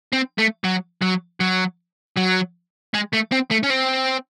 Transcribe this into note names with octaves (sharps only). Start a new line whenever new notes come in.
C4
A3
F#3
F#3
F#3
F#3
G#3
A3
C4
A3
C#4
C4